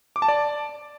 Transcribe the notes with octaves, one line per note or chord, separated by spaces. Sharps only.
D6
A5
D5